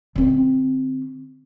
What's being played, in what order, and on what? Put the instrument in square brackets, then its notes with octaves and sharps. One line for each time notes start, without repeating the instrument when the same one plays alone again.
[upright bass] D3 C4